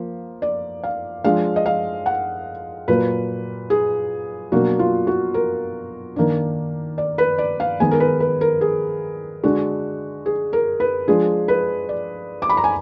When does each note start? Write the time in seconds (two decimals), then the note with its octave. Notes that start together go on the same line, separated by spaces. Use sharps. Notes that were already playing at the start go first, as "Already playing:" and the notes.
Already playing: F3 A#3
0.42 D5
0.84 F5
1.24 F3 G#3 D4 F5
1.56 D#5
1.66 F5
2.06 F#5
2.88 A#2 F#3 A#3 B4
3.70 G#4
4.52 B2 F#3 A#3 D4 F#4
4.79 F4
5.07 F#4
5.34 A#4
6.16 D#3 A#3 D4
6.98 D5
7.18 B4
7.38 D5
7.60 F5
7.80 D#3 G#3 B3 G#5
7.91 A#4
8.00 B4
8.20 B4
8.41 A#4
8.61 G#4
9.44 D3 G#3 D4 F#4
10.26 G#4
10.53 A#4
10.80 B4
11.08 F3 G#3 D4 G#4
11.48 B4
11.89 D5
12.42 D6
12.49 B5
12.57 A#5
12.64 G#5